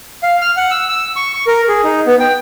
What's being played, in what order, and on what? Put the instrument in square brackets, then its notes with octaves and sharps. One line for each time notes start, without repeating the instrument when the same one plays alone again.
[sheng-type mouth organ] F5
F6
F#5
E6
E6
C#6
C#6
A#4
G#4
D#4
B3
G5